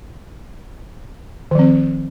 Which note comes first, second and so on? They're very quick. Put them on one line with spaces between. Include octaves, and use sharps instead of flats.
D#3 F3 C4